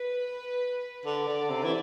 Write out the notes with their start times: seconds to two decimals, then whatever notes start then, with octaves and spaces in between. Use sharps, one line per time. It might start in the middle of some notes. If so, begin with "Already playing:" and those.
Already playing: B4
1.05 D3 D5
1.28 D3
1.50 C3
1.64 E3